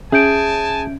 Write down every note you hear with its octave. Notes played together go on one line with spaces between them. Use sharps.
C#4 G#4 E5 G#5 A5 G6 D7